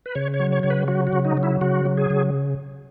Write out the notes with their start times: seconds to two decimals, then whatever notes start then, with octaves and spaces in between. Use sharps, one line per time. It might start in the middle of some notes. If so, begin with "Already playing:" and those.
0.06 B4
0.15 C#3 C#5
0.34 C#5
0.40 F#3
0.52 C#5
0.63 C#3 C#5
0.70 B4
0.88 F#3 F#4
1.07 F#4
1.13 C#3
1.25 D#4
1.37 F#3
1.43 E4
1.61 C#3 F#4
1.85 F#3
1.97 G#4
2.10 C#3